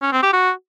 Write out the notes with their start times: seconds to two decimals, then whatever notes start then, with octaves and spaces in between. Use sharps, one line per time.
0.02 C#4
0.12 C4
0.23 G4
0.33 F#4